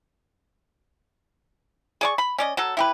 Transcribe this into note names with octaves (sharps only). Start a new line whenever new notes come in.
G#4 D5 C#6
B5
C#4 D5 D#5
F#3 A4
E4 G4 B4